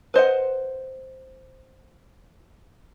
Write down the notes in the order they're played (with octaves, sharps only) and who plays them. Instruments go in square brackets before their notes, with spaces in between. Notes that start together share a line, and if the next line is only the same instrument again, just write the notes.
[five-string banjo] B4 C5 D#5 F#5